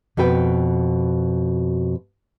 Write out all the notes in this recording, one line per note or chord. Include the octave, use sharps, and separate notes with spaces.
F2 B2 F#4 B4 G5